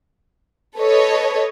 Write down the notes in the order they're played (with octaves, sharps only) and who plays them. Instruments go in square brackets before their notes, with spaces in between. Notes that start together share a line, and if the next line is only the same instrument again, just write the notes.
[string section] A4 B4 C#5 D#5